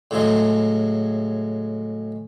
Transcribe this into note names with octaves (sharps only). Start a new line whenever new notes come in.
A2 C#3 F#3 G#3